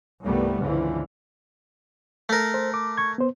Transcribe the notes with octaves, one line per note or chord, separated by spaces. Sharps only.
C2 G2 D#3 G3 A3 B3
C#2 D3 E3 F3
A3 A#4
C5
D6
C#6 G#6
B3 C5